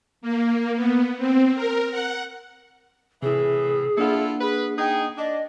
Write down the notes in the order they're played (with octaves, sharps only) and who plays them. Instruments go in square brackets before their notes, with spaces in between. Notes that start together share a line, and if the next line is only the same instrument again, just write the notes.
[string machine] A#3
B3
C4
A#4
F#5
[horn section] A2 E3 [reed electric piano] C3 E4 [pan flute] G#4
[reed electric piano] A#3 D4 F#5 [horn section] E4 F4 A4
[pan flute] G#4 [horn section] B4
[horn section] D#4 G#4 [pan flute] G5
[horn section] D4 [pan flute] D#5